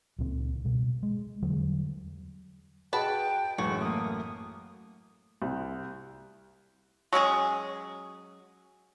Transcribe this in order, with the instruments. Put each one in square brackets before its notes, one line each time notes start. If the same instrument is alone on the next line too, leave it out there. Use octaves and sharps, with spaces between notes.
[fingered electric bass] C#2 A#2 C4
B2 G3
G#3
E2 D3 F#3 G3
[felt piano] F#4 G#4 D#5 [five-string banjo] B4 F#5 A5 [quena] G5
[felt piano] A1 F#2 A2 [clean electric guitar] G#3 A3 C#5 [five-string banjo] F#4
[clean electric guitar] A3 A#3 [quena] D#6
[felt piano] C2
[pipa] F#3 G#3 C#4 G#4